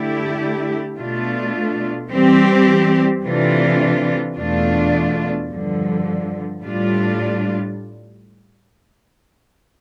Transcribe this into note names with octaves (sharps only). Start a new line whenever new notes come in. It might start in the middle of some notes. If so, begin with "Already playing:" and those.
Already playing: D3 A3 E4 G4
B2 A3 D4 F4
E3 G3 C4 G4
C3 E3 A3 D4 F4
E2 B2 A3 D4 F4
G2 D3 F3
A2 G3 D4 F4